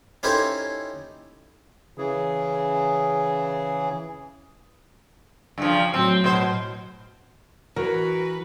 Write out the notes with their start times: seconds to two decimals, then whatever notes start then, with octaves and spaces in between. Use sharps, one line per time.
0.23 C#4 D#4 E4 G4 A4 C5
1.98 C#3 E3 G#4
5.58 G2 C#3 F3
5.94 A2 F#3 C4
6.24 B2 C5
7.76 E3 F#4 A#4 B4